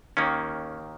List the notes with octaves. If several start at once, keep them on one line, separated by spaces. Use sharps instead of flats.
D#2 D#3 A#3 C#4